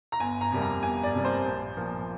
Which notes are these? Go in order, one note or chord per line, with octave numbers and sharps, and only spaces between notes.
A#5
G1 G#5
A#5
F2 C3 G3 A#3
A#5
G1 G#5
D5
F2 C3 G3 A#3
C5
A#1
A#2 F3 A#3